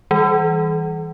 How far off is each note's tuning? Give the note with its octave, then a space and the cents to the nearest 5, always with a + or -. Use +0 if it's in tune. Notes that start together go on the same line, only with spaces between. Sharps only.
E3 -20 G3 +5